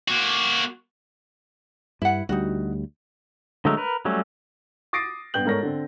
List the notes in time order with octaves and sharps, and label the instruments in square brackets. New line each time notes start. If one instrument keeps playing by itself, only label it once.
[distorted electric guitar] A#3 F#4
[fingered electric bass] G2 [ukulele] E4 F#5
[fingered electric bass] D2 G3 [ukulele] D#4 F#4
[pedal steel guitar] D3 F#3 G#3 A3 A#4
A#4 B4
F#3 G3 A3 C#4
[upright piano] D6 D#6 A6 A#6 C7 D7
G2 B3 G5 G6 F#7
G#2 A4 A#4 C#5 A#6
D3 C4